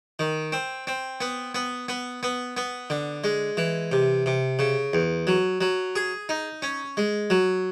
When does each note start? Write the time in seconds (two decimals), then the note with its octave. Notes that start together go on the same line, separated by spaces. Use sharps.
0.19 D#3
0.52 C4
0.87 C4
1.21 B3
1.55 B3
1.88 B3
2.23 B3
2.57 B3
2.90 D3
3.24 G#3
3.57 E3
3.92 C3
4.26 C3
4.59 C#3
4.93 E2
5.27 F#3
5.61 F#3
5.96 G#4
6.29 D#4
6.62 C#4
6.97 G#3
7.30 F#3